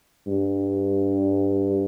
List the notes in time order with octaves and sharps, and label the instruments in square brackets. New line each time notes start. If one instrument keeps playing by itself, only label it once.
[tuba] G2